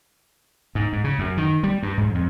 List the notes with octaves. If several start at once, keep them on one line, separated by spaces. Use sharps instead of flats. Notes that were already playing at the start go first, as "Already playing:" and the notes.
G#2
G#2
C#3
F#2
D#3
G3
G2
G#2
F2